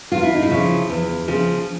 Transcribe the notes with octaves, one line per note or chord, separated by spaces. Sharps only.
E2 F4
E4
D#4
E4
C#3 F3
E2
C#3 F3